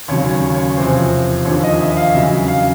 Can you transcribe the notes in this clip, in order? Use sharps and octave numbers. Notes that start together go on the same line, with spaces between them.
D#2 C#3 F#3 C#5
C#5
C#5
E2 C3 F3 C5
D#2 D3 F3 C#5
D#5
E5
F5
E2 C#3 F#3 E5
F5